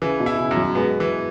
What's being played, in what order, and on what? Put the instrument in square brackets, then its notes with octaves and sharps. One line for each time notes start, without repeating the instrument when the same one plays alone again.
[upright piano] C#3 [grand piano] E3
[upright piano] B2
[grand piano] E4
[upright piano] C#3
[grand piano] F#2
[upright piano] F#3
[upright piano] G#3 [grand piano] B3
[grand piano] E3